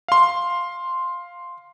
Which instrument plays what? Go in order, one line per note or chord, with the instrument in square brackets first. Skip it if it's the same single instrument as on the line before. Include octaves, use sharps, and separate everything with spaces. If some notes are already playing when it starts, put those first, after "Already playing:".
[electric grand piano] F5 C6